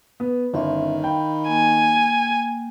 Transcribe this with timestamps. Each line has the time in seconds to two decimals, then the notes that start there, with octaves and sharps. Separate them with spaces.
0.20 B3
0.54 G1 D#3 C#4 E5
1.04 F5 G5 B5
1.48 A#3 G#5